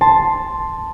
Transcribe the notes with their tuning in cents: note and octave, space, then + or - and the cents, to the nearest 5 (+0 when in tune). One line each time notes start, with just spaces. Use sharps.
A5 +0 C6 +0